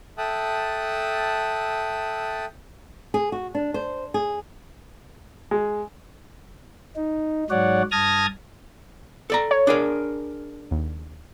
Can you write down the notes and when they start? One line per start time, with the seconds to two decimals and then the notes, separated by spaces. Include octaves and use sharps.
0.18 A4 E5 G5 A5 D#6 F#6
3.14 G#4
3.32 F#4
3.55 D4
3.74 C5
4.14 G#4
5.51 G#3
6.96 D#4
7.50 G#2 F#3 C#5 D5 F#5
7.91 G2 A5 D#6 F6 G#6 A#6
9.30 A4 D5 A#5
9.51 C#5
9.67 D4 G#4 A#4
10.71 D#2